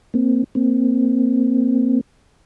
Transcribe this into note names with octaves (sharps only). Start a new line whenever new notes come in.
A#3 C4
A#3 C4